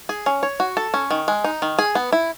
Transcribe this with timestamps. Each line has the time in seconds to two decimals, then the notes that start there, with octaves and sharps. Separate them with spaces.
0.09 G#4
0.26 C#4
0.43 C#5
0.60 F#4
0.77 A4
0.94 C#4
1.11 D#3
1.28 G#3
1.44 D#4
1.62 D#3
1.79 G#4
1.95 B3
2.13 E4